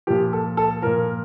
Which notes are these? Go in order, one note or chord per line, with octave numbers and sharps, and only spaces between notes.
A#2 F3 G4
A4
A4
A#2 F3 A#4